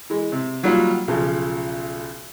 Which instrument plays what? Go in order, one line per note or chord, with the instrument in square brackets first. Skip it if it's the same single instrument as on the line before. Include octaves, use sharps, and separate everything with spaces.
[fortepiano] E3 G#3
C3
D#3 F#3 G3 A#3 F4 F#4
B1 C#3 F3